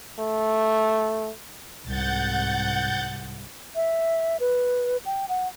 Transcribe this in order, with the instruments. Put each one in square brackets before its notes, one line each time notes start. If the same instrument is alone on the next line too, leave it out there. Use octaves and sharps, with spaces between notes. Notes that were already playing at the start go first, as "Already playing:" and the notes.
[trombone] A3
[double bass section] C2 G#2 [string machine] F#5 G6 A6
[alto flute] E5
B4
G5
F#5